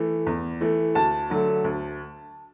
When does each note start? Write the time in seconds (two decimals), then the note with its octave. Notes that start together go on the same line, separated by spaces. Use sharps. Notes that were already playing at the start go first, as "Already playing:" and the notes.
Already playing: E3 A3
0.27 E2
0.61 E3 A3
0.95 D2 A5
1.30 D3 F#3 A3
1.64 D2